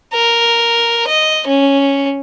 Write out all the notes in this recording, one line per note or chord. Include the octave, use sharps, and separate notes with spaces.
A#4
D#5
C#4